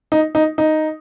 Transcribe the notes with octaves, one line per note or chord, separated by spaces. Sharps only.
D#4
D#4
D#4